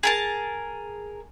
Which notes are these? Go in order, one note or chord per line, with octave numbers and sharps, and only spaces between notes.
G#4 A#4 A5